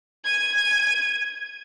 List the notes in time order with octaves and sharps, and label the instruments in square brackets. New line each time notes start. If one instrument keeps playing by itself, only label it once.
[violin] G#6 D#7